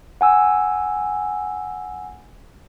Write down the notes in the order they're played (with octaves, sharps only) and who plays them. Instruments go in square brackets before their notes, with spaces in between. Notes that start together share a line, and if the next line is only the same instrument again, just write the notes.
[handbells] F#5 G#5 E6